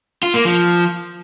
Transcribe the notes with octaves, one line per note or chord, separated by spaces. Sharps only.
F4
A#3
F3